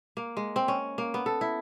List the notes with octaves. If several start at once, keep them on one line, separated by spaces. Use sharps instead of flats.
A#3
G#3
C4
C#4
A#3
B3
A4
E4